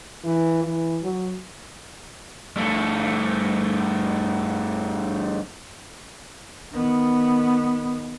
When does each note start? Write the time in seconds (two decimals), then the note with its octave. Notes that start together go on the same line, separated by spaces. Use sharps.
0.25 E3
0.64 E3
1.03 F#3
2.56 G2 A3
6.72 D#3 B3